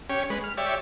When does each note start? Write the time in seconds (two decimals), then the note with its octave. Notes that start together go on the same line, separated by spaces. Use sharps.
0.10 C#4 G4 C#5
0.30 G#3 B4
0.44 F6
0.57 G4 C#5 D5 E5